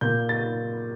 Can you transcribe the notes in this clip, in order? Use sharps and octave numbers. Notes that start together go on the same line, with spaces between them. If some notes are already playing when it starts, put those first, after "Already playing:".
A#2 G6
A6